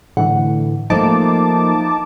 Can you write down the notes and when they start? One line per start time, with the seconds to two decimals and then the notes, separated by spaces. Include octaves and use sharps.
0.17 A2 D3 E3 F#5
0.90 F3 A3 A#3 D#4 A5 D6